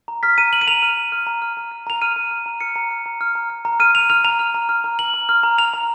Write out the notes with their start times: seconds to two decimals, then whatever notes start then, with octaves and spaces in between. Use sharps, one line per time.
0.08 A#5
0.23 F6 B6
0.38 A#5 D#7
0.53 F6 F#7
0.61 D#7
0.67 A#5 F7
0.82 F6
0.97 A#5
1.12 F6
1.27 A#5
1.42 F6
1.57 A#5
1.71 F6
1.87 A#5 F7
2.01 F6 D#7
2.16 A#5
2.31 F6
2.46 A#5
2.60 F6 C#7
2.76 A#5
2.91 F6
3.06 A#5
3.21 F6
3.35 A#5
3.50 F6
3.65 A#5
3.80 F6 D#7
3.95 A#5 F7
4.10 F6 F7
4.24 A#5 F7
4.39 F6
4.55 A#5
4.69 F6
4.84 A#5
4.99 F6 F#7
5.14 A#5
5.29 F6
5.43 A#5
5.58 F6 F7
5.73 A#5